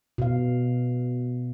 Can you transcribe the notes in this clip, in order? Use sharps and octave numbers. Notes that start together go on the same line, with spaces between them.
B2 F5